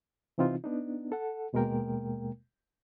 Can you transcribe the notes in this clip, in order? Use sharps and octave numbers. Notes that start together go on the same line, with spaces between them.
C3 E3 C4 D#4 F4
B3 D4 D#4
A4 F#5
D#2 B2 G#3 A#3 A#4 G5